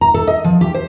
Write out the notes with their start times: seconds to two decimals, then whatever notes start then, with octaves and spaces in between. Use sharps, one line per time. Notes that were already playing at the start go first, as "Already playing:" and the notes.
0.01 A#5
0.14 A4
0.27 D#5
0.44 F3
0.61 G4
0.74 C5